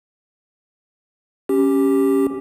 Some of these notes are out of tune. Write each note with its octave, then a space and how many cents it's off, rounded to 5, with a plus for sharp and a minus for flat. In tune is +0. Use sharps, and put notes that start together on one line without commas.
C#4 -5 G4 +0